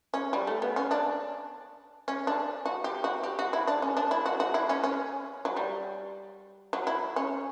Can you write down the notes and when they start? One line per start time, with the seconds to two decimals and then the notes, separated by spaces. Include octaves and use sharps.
0.14 C#4
0.33 G3
0.47 A3
0.62 B3
0.76 C#4
0.91 D4
2.08 C#4
2.27 D4
2.65 F#4
2.84 G4
3.04 F#4
3.23 G4
3.39 F#4
3.53 E4
3.67 D4
3.82 C#4
3.97 D4
4.11 E4
4.26 F#4
4.40 F#4
4.54 E4
4.69 C#4
4.84 C#4
5.45 F#3
5.57 G3
6.73 F#3
6.87 E4
7.16 C#4